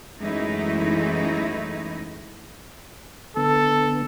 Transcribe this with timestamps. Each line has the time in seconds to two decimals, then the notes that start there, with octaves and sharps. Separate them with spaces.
0.20 F#2 E3 G#3 A3 D#4 E4
3.37 D3 B3 A4